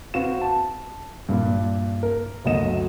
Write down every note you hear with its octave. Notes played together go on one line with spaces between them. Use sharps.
C4 F#4 B4 F5 E7
A5
G2 A#2
A#4
G1 D2 F#3 D#5 E7